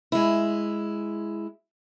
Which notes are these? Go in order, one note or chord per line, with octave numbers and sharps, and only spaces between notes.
G#3 E4